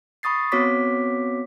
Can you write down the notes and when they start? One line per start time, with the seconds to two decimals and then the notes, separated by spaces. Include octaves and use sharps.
0.23 B5 C#6 D#6 A6 C7
0.52 B3 C4 F#4 C#5 D6 B6